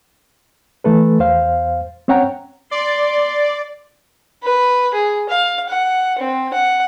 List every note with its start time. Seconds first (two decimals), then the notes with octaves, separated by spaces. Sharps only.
0.84 E3 A3 A4 B4
1.20 E2 C5 F5
2.08 C4 C#4 C#5 F#5 G5 A#5
2.71 D5 C6
4.43 B4
4.94 G#4
5.30 F5
5.69 F#5
6.19 C4
6.54 F#5